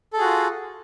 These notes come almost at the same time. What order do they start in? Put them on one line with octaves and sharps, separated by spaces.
A4 G#4 F#4 F4